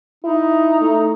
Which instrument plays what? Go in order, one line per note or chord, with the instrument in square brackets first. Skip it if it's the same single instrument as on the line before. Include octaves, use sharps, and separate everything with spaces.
[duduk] D#4 [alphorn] E4
[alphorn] A3